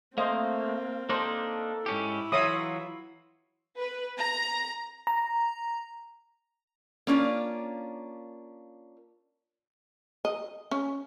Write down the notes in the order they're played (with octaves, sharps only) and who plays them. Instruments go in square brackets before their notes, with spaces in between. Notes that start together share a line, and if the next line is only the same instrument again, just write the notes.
[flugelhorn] A3 [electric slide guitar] A#3 [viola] C4 [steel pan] C5 D#5 F5
[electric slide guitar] A#3 D4 D#4 [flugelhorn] A4 [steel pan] C5
[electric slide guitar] G#2 C#4 G4 [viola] E4
[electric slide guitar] E3 F#3 F4 [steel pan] C#5 E5 D#6
[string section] B4
A#5
[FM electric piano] A#5
[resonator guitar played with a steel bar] A#3 C#4 D4 F4
[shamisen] D#5
C#4